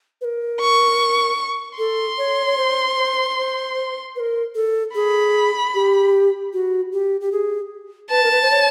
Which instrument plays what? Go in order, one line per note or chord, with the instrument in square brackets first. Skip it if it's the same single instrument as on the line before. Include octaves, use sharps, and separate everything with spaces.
[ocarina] B4
A#4
[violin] C#6
[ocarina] A4 [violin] C6
[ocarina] C#5
C#5
C5
C5
C5
B4
A#4
A4
[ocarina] G#4 [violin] B5
[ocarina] G4
F#4
G4
G4
G#4
[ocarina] B4 [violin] A5
[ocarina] A#4
B4
C5
C#5